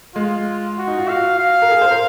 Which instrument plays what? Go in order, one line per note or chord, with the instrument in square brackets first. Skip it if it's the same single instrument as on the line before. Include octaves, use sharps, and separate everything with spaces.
[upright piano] G#3 [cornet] F4
[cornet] F#4
[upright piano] D#4
F4
[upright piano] F#4 [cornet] F5
[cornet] F5
[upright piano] A#4
G#4
C5
A#4